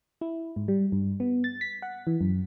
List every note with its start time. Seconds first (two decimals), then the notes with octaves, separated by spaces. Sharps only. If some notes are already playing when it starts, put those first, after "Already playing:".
0.21 E4
0.56 G#2
0.68 G3
0.92 G2
1.20 B3
1.44 A6
1.61 B6
1.82 F#5
2.07 E3
2.21 F#2